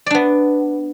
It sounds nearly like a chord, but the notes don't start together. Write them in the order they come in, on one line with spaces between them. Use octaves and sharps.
D5 D4 B3